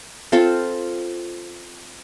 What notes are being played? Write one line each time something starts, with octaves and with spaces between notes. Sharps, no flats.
C4 F4 A4